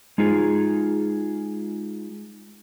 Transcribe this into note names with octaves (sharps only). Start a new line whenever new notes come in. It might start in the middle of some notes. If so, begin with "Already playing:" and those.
G#3 D#4 F4 G#4